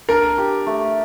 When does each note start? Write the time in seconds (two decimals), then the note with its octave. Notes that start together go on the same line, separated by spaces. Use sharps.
0.09 D4 A#4
0.38 G4
0.67 A3